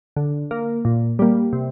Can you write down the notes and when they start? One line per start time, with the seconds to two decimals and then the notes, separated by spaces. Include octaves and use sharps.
0.16 D3
0.51 A#3
0.85 A#2
1.19 G3 A#3
1.53 C3